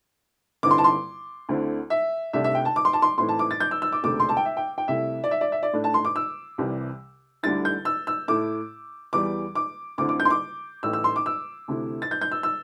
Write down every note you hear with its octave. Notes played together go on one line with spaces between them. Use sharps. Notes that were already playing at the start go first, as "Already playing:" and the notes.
G2 D3 C4 E4 D6
C6
A5
C6
D2 D3 A3 C4 E4
E5
C2 C3 A3 D4 E5
E5
G5
A5
D6
C6
A5
C6
A2 E3 A3 C4 E4 C6
A5
D6
A6
G6
E6
E6
D6
E1 D2 C3 A3 D6
C6
A5
G5
E5
G5
G5
C2 C3 A3 E4 E5
D5
E5
D5
E5
D5
A2 A3 D4
A5
C6
D6
E6
C2 C3 E3 G3
D2 D3 G3 E4 A6
G6
E6
E6
A2 A3 E4 D6
E2 E3 G3 D6
D6
D2 D3 C4 E4 D6
D6
G6
C6
D6
A1 A2 A3 E6
E6
C6
D6
E6
D2 C3 A3 E4
A6
G6
G6
E6
E6